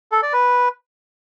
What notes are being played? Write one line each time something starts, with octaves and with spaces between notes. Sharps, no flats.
A4
D5
B4